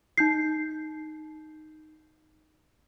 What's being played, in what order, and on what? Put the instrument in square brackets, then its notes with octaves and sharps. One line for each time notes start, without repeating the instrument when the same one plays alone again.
[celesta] D#4 G6 C7